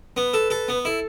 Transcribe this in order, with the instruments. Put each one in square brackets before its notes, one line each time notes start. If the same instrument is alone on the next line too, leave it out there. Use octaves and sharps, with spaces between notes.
[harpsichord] B3 [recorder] B4
[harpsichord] A4
A4
B3
[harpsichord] E4 [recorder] A4